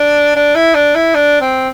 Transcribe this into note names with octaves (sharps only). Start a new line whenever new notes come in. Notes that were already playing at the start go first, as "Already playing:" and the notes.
Already playing: D4
D4
E4
D4
E4
D4
C4